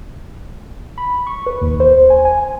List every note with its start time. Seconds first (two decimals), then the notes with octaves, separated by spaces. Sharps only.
0.98 B5
1.27 C#6
1.46 B4
1.61 D#2
1.80 C5
2.10 G#5
2.25 G#5